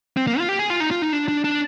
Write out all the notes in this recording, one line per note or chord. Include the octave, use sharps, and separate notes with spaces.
C4
A#3
F4
G4
G#4
F4
D#4
F4
D#4
D4
D4
D4